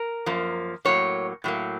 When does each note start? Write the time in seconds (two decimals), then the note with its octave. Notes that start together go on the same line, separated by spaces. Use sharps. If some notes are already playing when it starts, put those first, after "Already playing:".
Already playing: A#4
0.26 F#2 F3 A#3
0.85 A2 F#3 A#3 C#5
1.44 A2 F#3 A#3